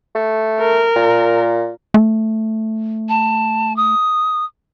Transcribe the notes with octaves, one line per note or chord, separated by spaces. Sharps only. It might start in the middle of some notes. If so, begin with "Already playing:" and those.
A3
A#4
A#2
A3
A5
D#6